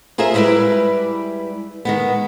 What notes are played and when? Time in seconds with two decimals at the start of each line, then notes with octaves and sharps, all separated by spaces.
0.18 F4 G#4 A#4 C5 E5
0.34 G3 G#3 E4 B4 D5
1.85 D#3 G#3 B3